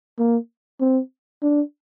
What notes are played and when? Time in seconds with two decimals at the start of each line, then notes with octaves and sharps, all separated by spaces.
0.19 A#3
0.81 C4
1.43 D4